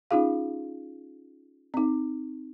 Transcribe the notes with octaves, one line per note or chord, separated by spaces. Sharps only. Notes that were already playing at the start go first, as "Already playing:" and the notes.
C#4 D#4 F4 G#4 F5
C4 D#4